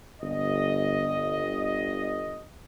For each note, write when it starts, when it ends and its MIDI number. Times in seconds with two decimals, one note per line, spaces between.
0.22 2.47 31
0.22 2.47 75